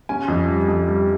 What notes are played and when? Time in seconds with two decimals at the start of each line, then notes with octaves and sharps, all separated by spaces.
0.09 C#4 G#5
0.28 F2
0.48 G3
0.68 F2
0.87 G3